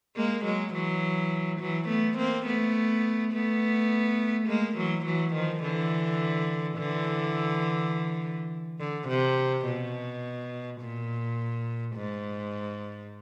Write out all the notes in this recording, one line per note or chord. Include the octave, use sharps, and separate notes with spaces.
G#3 A#3
F#3 G#3
E3 F#3
E3 F#3
A3 B3
A#3 C4
A3 B3
A3 B3
G#3 A#3
E3 F#3
E3 F#3
D#3 F3
D3 E3
D3 E3
D3
C3
B2
A#2
G#2